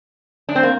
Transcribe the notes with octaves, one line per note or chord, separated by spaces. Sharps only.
D4
C4
A#3